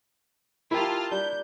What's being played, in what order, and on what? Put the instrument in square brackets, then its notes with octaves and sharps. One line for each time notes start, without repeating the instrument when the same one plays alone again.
[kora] A#3 A#4 [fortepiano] E4 G4 [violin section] F4 A5 F6
[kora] G3 D4 [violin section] G6